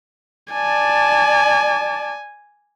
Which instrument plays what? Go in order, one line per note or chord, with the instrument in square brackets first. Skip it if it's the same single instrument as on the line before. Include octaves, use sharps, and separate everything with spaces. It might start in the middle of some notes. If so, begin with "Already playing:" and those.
[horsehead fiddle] D5 A5 [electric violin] G#5